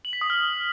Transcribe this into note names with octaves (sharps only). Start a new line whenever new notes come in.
F#7
B6
D#6
F6